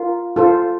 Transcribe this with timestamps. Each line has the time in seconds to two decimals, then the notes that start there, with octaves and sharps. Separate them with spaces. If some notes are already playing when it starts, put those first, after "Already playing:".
Already playing: F4 A#4
0.36 F4 A4 C5